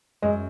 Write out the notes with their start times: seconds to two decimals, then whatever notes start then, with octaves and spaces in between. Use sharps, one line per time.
0.22 F#2 G#3